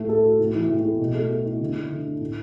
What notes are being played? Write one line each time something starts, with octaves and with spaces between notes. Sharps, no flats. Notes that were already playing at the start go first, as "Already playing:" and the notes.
Already playing: A2 A3
A4
F#4
A2
E3
A2
A3
B2
A3
A4
E4
D3
A3
D3
D4
A2